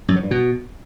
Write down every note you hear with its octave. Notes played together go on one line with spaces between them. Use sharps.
F#2
F#3
G2
B2